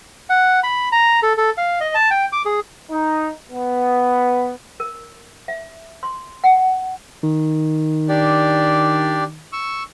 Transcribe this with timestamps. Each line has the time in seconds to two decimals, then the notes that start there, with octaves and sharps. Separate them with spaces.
0.30 F#5
0.63 B5
0.92 A#5
1.23 A4
1.38 A4
1.58 F5
1.81 D#5
1.95 A5
2.11 G5
2.33 D6
2.45 G#4
2.91 D#4
3.51 B3
4.80 A#4
5.48 E5
6.03 C6
6.44 F#5
7.23 D#3
8.09 D4 G4 D5
9.53 C#6 E6